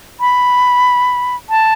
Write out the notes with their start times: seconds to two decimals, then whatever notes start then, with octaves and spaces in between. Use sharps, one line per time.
0.20 B5
1.50 A5